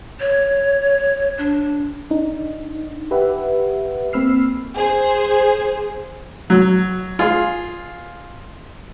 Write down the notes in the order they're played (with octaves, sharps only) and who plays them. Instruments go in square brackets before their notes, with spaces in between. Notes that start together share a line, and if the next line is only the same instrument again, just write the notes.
[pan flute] C#5
D4
[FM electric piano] D4 D#4
G4 B4 E5 F#5
A#3 C4 B5 E6 F6 C7
[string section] G#4 C5
[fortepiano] F#3
F4 G#4